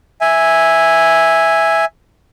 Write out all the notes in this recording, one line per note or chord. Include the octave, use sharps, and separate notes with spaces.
E5 G#5